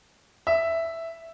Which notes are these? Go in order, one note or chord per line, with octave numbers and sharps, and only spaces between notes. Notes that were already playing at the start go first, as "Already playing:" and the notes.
E5